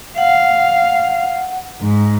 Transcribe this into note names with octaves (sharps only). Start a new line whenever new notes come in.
F5 F#5
G#2